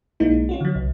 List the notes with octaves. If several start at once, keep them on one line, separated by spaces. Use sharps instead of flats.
B1 G#3 A#3 D#4 E4
C#4 F4 F#4
D3 F#3
C2